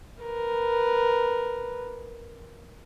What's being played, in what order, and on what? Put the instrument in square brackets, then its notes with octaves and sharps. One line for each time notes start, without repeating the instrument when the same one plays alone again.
[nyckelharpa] A#4 B4